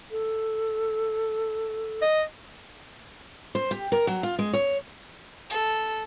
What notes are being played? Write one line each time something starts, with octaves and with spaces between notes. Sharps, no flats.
A4
D#5
C5
G4
A#4
F#3
F4
G#3
C#5
A4